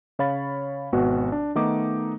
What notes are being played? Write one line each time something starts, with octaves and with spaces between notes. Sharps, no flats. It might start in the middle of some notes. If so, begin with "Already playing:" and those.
C#3 C#5 F5 B5 A6
G#1 B2 B3 F#4
D4
D#3 A3 B3 D#4 D6